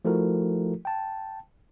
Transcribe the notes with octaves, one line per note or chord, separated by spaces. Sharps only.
F3 A3 E4 F#4 A4 A#4
G5 A5